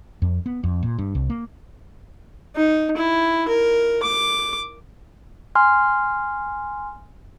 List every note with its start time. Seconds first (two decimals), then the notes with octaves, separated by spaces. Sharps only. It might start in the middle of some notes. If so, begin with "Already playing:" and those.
0.22 F2
0.46 B3
0.64 F2
0.83 A#2
0.99 G2
1.15 C2
1.30 A#3
2.56 D#4
2.97 E4
3.48 A#4
4.03 D6
5.55 G#5 C6 F6